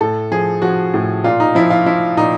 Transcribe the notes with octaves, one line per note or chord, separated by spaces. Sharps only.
A2 A4
F3 G#4
F3 F#4
A2
A#2 F4
D#4
F3 E4
F4
F3 E4
A#2 D#4